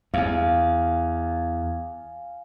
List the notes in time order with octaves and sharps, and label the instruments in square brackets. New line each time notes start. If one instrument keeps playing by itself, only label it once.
[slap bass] E2 [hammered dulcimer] F5 G#5